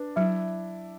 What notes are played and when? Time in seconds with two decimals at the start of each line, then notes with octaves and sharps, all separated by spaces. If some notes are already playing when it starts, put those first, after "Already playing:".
Already playing: D4 B4
0.16 F#3 E4